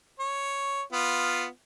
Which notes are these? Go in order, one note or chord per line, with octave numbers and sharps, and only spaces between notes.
C#5
B3 F4